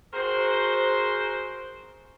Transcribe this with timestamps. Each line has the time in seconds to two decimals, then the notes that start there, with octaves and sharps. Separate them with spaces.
0.13 F#4 G#4 A#4 C5